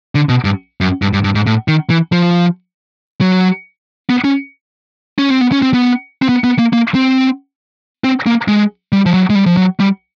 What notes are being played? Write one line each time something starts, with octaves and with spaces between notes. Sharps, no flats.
D3
B2
G2
F#2
G2
G2
G2
G#2
A2
D#3
E3
F3
F#3
B3
C#4
C#4
C4
B3
C#4
C4
B3
C4
B3
B3
A#3
A#3
C4
C4
A#3
G#3
G3
F3
F#3
G#3
G3
F3
F#3
G3